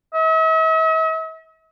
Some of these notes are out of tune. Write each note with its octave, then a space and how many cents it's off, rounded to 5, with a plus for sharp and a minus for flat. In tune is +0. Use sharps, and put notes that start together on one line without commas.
E5 -45